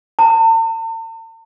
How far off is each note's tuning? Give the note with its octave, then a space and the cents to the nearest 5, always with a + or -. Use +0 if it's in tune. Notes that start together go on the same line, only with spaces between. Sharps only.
A5 +45